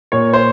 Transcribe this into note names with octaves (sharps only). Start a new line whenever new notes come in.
A#2 C#5
C5